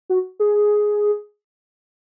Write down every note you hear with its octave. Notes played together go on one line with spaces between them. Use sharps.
F#4
G#4